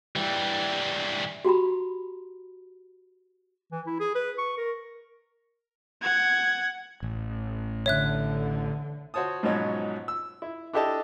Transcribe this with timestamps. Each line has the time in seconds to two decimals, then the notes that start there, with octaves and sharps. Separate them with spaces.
0.16 E3 G3
1.45 F#4 G4 A#5 B5
3.72 E3
3.87 E4
4.00 G#4
4.15 B4
4.38 C#6
4.58 A#4
6.02 F#5 G#6
7.03 A1
7.86 D3 C#5 E5 F#6
9.14 F#4 C5 C#5 A5 D#6
9.43 G#2 B2 F3 F#3 C#4 D#4
10.08 E6
10.42 E4
10.73 D4 E4 G4 A4 D#5 A5